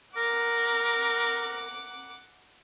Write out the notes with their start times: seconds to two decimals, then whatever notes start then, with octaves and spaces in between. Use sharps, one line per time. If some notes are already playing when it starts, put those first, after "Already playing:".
0.17 A#4 F#5 D6